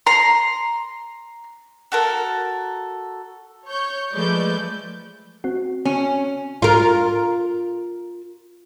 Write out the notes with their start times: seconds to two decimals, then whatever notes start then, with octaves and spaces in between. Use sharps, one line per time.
0.07 A#5 C6
1.92 F#4 A4 A#4
3.67 C#5 C#6 G6
4.14 F3 G#3 A3 B4 D5 G6
5.44 C4 F#4
5.85 C#4
6.62 F4 A#4